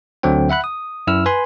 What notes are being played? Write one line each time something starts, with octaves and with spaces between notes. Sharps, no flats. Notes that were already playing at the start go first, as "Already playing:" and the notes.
D2 D3 F#3 C4 G5
E5 F#5 B5 F#6
D#6
F#2 E4 E6 F6
B4 G#5 B5 C6